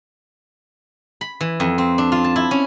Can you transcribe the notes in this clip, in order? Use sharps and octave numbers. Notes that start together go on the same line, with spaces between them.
B5
E3
F2
C4
D4
F4
A5
E4
C#4